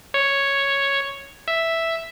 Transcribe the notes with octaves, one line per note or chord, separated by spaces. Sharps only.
C#5
E5